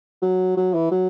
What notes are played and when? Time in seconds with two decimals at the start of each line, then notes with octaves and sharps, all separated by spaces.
0.22 F#3
0.57 F#3
0.74 E3
0.91 F#3